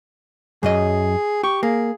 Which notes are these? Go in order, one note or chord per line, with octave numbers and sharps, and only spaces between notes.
F#2 F#3 G#4 D#5
G4 C#6
A#3 G#4